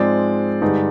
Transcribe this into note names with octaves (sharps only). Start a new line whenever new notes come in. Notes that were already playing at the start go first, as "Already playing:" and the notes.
Already playing: G#2 F3 G#3 C4 D5
G2 D3 G#3 D#4